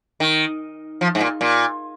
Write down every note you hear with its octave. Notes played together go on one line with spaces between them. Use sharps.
D#3
F3
G#2
A#2
A#2